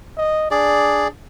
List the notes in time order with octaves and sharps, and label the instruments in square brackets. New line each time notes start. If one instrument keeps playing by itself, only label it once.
[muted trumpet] D#5
[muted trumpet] D4 [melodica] G#4 D5